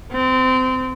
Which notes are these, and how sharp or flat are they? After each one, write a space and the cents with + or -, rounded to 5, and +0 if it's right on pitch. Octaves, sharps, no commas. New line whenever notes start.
C4 -25